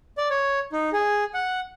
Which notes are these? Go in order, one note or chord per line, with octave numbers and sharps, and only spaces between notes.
D5
C#5
D#4
G#4
F#5